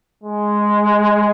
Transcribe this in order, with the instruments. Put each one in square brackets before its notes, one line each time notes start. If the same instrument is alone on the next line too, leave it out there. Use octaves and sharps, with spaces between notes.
[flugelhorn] G#3